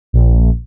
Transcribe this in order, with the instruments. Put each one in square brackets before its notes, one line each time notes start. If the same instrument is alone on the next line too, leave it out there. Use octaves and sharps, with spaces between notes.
[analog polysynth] A#1